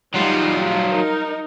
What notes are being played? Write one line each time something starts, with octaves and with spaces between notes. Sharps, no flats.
F#3 G3 D#4 F4
D#4 A#4